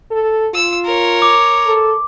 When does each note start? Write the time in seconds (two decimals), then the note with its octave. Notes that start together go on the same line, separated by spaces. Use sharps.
0.11 A4
0.54 F4 E6
0.85 A#4 C#5
1.22 D6
1.66 A4